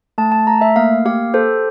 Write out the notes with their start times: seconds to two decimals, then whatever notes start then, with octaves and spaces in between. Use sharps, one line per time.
0.18 A3 A5
0.32 A5
0.47 A3 A#5
0.61 E5
0.76 A#3 F5
1.05 G4 F5
1.34 A4 C5